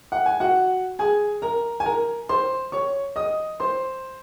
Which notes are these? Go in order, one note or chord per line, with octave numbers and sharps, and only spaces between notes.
F#5
G#5
F#4 F#5
G#4 G#5
A#4 A#5
G#5
A#4 A#5
C5 C6
C#5 C#6
D#5 D#6
C5 C6